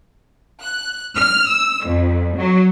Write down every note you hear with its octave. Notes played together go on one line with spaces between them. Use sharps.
F#6
F6
E6
F2
F#3